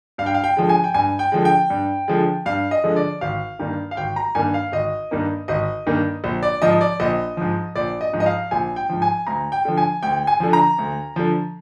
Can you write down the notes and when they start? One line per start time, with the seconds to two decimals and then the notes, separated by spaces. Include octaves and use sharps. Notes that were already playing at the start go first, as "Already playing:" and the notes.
0.18 G2 F5
0.26 G5
0.34 F5
0.44 G5
0.57 D3 F3 G#3
0.69 G#5
0.84 G5
0.94 G2 G#5
1.19 G5
1.32 D3 F3 G#3
1.45 G5
1.70 G2
2.08 D3 F3 G#3
2.46 G2 F5
2.71 D#5
2.84 D3 F3 G#3
2.96 D5
3.21 G#1 F5
3.59 G2 D#3 A#3
3.91 F5
3.97 G#1 G5
4.16 A#5
4.35 G2 D#3 A#3 G#5
4.54 F5
4.72 G#1 D#5
5.11 G2 D#3 A#3
5.48 G#1 D#5
5.86 G2 D#3 A#3
6.24 A#1
6.43 D5
6.62 G#2 F3 D#5
6.81 D5
7.00 A#1 D#5
7.37 G#2 F3
7.75 A#1 D5
8.01 D#5
8.13 G#2 F3
8.20 D#5
8.26 F5
8.51 A#1 G#5
8.76 G5
8.89 G#2 F3
9.02 G#5
9.27 D2 A#5
9.52 G5
9.65 D3 F3
9.77 G#5
10.03 D2 G5
10.27 G#5
10.40 D3 F3
10.53 A#5
10.78 D2
11.16 D3 F3